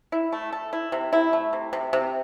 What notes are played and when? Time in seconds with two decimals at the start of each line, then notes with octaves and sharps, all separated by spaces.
0.12 E4
0.32 A3
0.52 A4
0.73 E4
0.92 C3
1.13 E4
1.33 A3
1.53 C3
1.73 C3
1.93 C3